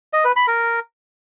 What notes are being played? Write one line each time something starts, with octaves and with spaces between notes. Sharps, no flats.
D#5
B4
B5
A#4